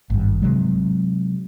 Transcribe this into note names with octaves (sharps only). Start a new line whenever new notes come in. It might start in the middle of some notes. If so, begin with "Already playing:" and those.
G#1 G2
C3 F#3 G#3